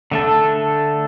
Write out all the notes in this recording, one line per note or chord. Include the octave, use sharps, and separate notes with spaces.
D3 A3 D4 A4